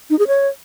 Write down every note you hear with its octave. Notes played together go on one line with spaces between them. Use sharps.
D#4
G#4
C#5